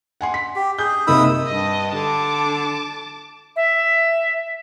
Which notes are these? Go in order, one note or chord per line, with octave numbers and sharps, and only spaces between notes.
F#5 G#5 C6
B6
G4
G#4 G6
C3 A#3 D#4 B5 D#6 E6
G2 D#5
D3 A5 D6
E5